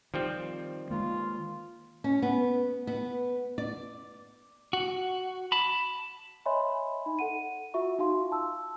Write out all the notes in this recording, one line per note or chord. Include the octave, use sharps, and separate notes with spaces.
D#3 F3 G3 C4
D#3 G#3 A#3 F4
C#4
B3
B3
D5
F#4
A5 B5
C#5 D#5 E5 G#5 B5 C6
D#4 B5
A4 F#5 D#7
F4 F#4 E5 C#6
D#4 F4 F#4 F5 C6
A5 E6